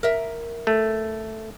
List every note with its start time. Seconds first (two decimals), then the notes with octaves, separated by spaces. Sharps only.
0.03 A#4 E5
0.67 A3